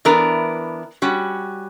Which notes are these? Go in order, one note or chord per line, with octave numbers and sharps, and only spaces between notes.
E3 B3 D4 A#4
G3 C#4 F#4